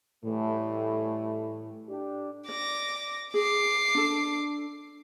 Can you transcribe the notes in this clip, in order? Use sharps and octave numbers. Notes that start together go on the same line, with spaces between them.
A2 E3 G3 A3
D4 G4
D5 D6 A#6
G#4 D6 C7
D4 A4